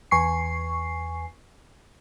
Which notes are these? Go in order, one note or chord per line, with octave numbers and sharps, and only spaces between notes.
E2 G#5 C#6 C7